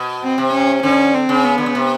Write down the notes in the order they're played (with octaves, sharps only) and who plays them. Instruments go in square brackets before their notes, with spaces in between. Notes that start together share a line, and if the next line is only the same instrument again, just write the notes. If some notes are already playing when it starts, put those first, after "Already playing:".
Already playing: [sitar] B2
[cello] C4
[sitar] C3
[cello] C#4
[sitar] D3 [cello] C#4
[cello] C4
[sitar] C#3
[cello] B3
[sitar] D3
C#3
C3